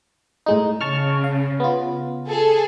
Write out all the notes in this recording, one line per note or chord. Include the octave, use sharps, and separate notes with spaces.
A2 G#3 D#4
C#3 A5 C#6 F6
F5
B3 F4
G#4 A4